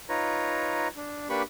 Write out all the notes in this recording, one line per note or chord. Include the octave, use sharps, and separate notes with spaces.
D#4 F4 B4 C#5 A#5
D4
A#3 D4 G4 B4 B5 C#6